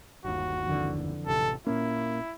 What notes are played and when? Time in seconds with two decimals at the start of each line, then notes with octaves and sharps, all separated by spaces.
0.24 G1 D#2 F#4
0.67 F2 D3 E3
1.27 A1 C3 A4
1.67 A#2 A#3 C#4 E4